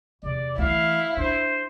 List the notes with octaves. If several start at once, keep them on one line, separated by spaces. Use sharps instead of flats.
E2 C3 D5
E3 A3 E4 F5
D4 C5